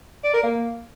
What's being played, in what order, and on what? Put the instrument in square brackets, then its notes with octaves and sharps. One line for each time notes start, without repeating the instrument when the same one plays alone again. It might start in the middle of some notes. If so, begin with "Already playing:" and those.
[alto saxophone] D5
A#4
A#3